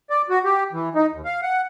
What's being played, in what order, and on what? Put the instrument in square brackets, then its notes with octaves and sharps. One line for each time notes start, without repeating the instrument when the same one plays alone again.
[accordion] D5
F#4
G4
E3
D#4
D#2
F5
F#5